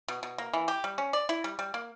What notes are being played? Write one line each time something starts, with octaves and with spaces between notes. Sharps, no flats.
B2
B2
A#3
E3
G4
G3
C#4
D5
E4
G3
G3
A#3